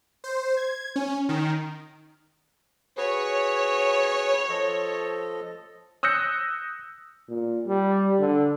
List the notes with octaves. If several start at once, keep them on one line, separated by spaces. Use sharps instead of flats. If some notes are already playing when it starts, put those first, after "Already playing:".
C5
G#6
C#4
D#3
F#4 G#4 B4 C#5
F3 A4 D#5
D#6 E6 F#6 G6 A#6 C#7
A#2
G3
D3